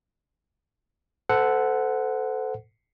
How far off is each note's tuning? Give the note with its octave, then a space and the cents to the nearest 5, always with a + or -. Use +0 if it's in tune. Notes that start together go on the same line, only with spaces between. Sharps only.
A4 +0 C5 -35 F#5 +0